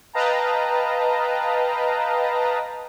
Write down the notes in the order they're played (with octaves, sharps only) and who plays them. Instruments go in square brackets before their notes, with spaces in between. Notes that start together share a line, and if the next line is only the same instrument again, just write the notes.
[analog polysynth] B4 D#5 F5 G5 A5 A#5